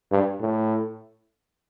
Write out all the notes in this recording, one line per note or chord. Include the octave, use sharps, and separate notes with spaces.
G2
A2